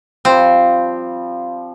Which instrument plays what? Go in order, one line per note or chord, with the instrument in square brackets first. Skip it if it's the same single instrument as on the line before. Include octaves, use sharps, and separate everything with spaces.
[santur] F3 G3 [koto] C4